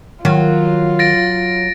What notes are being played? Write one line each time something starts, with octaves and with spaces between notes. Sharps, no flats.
D#3 F#3 F4
A6 A#6 D7